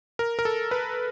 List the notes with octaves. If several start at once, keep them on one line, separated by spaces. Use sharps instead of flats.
A#4
A#4
A4
B4